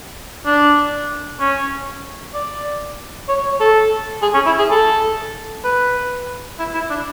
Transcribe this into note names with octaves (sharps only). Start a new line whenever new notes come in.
D4
C#4
D5
C#5
C#5
A4
G#4
C#4
E4
G#4
A4
B4
E4
E4
D4